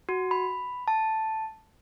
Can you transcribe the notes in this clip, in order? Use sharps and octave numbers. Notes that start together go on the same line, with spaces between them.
F#4
B5
A5